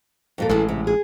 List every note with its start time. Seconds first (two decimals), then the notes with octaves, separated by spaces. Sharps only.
0.38 F2 A#2 A4
0.49 A1 E3 G#3 A4
0.69 C3
0.87 G#4